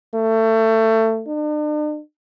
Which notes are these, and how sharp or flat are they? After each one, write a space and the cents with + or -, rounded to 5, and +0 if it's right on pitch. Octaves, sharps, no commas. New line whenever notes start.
A3 +25
D4 +45